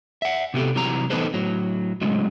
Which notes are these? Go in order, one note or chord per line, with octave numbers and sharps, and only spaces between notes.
E5 F#5
C3 B3 G4 A4
C3 E3 F#3 G3 A#5
E3 B3 D#4 A4 B4 C5
A2 F#3
A2 C#3 F#3 G#3